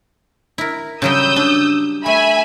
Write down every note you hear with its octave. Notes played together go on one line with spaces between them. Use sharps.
E4 A#4
C#3 F#3 G3 D#6 E6 G6
D4
A3 E5 G#5 B5